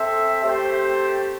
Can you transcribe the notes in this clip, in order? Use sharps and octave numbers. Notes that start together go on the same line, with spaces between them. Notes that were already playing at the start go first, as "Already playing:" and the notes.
Already playing: C4 A4 E5
A3 C4 G4 C5